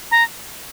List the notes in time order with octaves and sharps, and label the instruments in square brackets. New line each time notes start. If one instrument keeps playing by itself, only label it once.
[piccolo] A#5